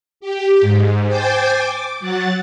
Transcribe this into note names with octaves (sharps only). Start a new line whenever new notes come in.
G4
G#2
C5 G5 G#5 D6 G6 A6
D6
F#3 F#5 A6